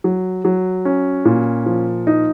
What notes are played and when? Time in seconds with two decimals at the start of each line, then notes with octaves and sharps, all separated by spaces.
0.04 F#3
0.45 F#3
0.85 C#4
1.25 A#2
1.66 F3
2.07 D#4